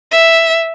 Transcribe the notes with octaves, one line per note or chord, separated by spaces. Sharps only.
E5